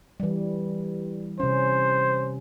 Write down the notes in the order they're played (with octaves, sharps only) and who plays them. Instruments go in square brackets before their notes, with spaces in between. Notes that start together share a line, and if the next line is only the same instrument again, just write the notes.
[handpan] E3 G3
[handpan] C3 C#4 [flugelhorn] C5